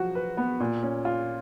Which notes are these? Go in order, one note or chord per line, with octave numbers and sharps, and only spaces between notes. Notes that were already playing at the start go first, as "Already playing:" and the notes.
Already playing: F3 F#3 F#4
B4
B3
A#2
C#4
F4